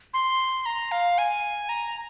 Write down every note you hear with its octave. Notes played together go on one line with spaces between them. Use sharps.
C6
A#5
F5
G#5
A#5